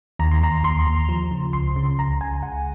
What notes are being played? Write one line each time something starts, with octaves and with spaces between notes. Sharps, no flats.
D#2 A#5
C6
D#2 A#5
D#2 C6
D#2
F3
C#3
C#2 C6
C#3
C#2 A#5
C#2 G#5
C#2 F#5